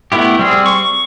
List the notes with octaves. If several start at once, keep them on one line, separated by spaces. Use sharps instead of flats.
A3 B3 E4 G4
G3 C4 G#4
C#6